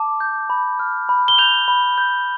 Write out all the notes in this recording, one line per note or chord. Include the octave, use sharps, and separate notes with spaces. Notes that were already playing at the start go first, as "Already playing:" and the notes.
Already playing: A5 D6
G6
B5
F6
B5
G7
G6 F7
B5
G6